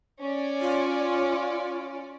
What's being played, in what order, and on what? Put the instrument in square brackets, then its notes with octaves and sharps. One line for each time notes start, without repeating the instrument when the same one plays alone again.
[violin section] C#4 D5
[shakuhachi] F4